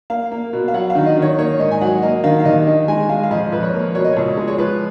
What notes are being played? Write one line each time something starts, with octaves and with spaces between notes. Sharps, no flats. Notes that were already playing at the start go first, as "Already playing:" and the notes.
A#3 F5
A#3
B2
F5
F#3 F#5
F5
D#3
D#5
D#3
C#5
A#3 C#5
G#2 D#5
G#5
F#3 F#5
A#3 D#5
D#3 F5
F5
D#2 D#5
D#3 D#5
G#3 G#5
G#3 F5
F5
F2 D#5
F2 B4
C#5
A#3
B2 C#5
D#5
C#2 C#5
G#3
C#5
F3 B4